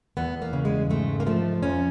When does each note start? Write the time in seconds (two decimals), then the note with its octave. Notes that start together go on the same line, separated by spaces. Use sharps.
0.17 E2 B3
0.42 A#3
0.53 C#3
0.65 G#3
0.90 G#2 A3
1.20 A#3
1.26 F3 A3
1.63 F2 C#4